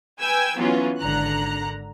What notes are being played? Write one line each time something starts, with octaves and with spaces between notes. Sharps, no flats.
B4 G5 G#5 E6 G#6
E3 F#3 B3 C#4 F4
G#1 D3 A#5 F#6